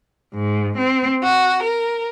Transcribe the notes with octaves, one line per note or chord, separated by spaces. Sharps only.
G#2
C4
F#4
A#4